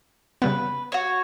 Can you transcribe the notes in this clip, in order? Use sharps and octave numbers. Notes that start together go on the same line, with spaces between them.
C#3 G3 B3 B4
F#4 C#5